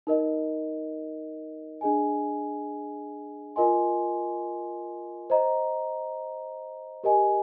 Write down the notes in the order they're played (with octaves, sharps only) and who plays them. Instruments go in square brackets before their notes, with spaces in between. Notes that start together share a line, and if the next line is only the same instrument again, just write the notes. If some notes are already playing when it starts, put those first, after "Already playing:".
[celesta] D#4 A#4 D#5
D4 G#4 D#5 G#5
F4 A#4 D#5 G#5 C6
C5 D#5 A#5
G4 A#4 D#5 G#5